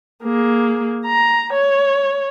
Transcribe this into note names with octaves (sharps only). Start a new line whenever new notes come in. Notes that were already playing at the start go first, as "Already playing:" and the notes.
A#3 G#4
A#5
C#5